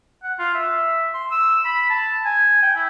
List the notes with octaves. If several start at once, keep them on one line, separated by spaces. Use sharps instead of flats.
F#5
F4
E5
C6
E6
B5
A5
G#5
G5
E4